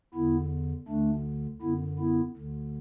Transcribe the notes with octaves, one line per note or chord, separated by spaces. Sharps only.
E2 D3 B3 E4
D2 D3 A3 D4
F#2 D3 B3 E4
B3 E4
D2 D3